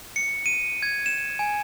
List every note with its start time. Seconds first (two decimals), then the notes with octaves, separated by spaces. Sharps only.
0.16 C#7
0.46 D#7
0.82 G#6
1.06 E7
1.39 G#5